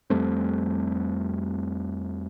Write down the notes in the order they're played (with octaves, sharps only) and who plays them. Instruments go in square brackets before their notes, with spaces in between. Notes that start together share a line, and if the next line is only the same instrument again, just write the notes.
[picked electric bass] F2 G3 A3 C4